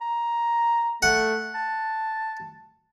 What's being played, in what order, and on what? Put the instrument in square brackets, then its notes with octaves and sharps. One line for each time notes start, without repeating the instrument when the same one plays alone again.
[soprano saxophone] A#5
[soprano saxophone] A3 [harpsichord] F#5
[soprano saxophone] A5